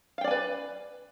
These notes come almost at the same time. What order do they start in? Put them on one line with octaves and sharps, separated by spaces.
F5 G5 D5 G#5 B4